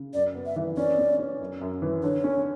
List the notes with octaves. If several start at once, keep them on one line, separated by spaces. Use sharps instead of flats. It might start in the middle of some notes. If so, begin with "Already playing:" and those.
Already playing: C#3
F#2 D5
B3
E5
E3
C#4 D5
C#4
C#4
F#2
F#2
E3
D3 C#5
C#4